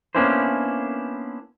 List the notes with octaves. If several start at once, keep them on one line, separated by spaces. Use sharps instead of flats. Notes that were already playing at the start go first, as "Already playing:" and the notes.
A#3 B3 C#4 D4 E4 C5